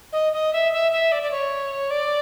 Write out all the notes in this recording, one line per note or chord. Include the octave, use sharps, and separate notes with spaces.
D#5
D#5
E5
E5
E5
D5
D5
C#5
D5